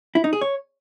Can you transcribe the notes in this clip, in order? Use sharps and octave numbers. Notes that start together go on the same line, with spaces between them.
E4
D#4
G#4
C#5